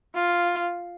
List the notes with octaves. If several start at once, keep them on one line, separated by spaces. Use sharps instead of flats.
F4